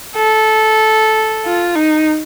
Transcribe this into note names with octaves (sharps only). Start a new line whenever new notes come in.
A4
F4
D#4